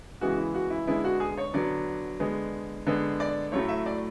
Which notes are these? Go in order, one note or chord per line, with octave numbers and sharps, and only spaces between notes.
C#3 E3 G#3 B3 F#4
E4
F#4
E4
D3 G#3 B3 E4
F#4
G#4
C#5
D3 F#3 B3 D5
D3 G#3 B3
D3 G#3 B3
D5
A2 F#3 A3 C#5
E5
D5